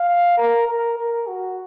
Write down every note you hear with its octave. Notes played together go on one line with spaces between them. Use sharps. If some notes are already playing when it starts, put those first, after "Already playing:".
Already playing: F5
A#4
A#4
A#4
F#4